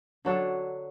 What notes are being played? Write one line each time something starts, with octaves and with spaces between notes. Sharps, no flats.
D3 F#3 D4 A4